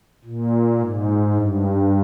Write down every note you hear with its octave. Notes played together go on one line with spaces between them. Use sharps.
A#2
G#2
G2